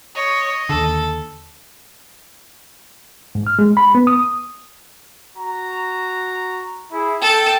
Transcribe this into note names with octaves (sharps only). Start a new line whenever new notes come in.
C#5 D#5
D#2 D3 A4
G#2
F6
G#3
B5
B3
D#6
F#4 A#5
E4 G#4
A4 G5